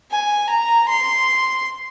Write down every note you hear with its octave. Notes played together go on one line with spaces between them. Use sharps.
G#5
A#5
C6